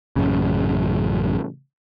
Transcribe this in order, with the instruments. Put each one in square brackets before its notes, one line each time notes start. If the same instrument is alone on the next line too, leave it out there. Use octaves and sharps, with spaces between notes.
[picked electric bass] A1 F#2 C#3